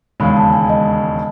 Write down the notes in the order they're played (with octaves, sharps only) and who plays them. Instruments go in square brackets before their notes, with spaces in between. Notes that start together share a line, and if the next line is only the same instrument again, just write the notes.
[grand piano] E1 D#2 C#3 G#3 [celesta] B5
[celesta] A5
G#5
D#5